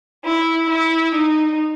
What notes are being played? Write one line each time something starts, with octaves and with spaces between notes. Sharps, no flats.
E4
E4
D#4